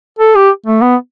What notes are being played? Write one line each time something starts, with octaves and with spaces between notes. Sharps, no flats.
A4
G4
A3
B3